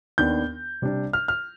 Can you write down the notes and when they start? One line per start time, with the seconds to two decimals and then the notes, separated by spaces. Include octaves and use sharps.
0.18 D#2 D#3 B3 D4 G6
0.82 C3 G3 D4
1.13 F6
1.28 F6